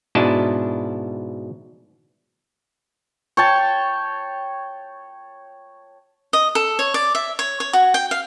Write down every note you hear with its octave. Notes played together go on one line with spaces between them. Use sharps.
G#2 B2 D4 E4 D#5 A5
C#5 G5 A5
D#5
A4
C#5
D5
E5
C#5
C#5
F#4
G5
F5